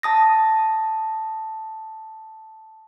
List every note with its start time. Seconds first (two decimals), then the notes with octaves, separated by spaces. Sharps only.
0.03 A5 D#6 A#6